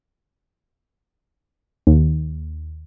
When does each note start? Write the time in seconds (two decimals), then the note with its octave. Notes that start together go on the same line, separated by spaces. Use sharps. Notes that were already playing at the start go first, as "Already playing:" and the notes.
1.87 D#2